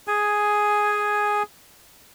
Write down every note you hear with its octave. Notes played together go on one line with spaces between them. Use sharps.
G#4 G#5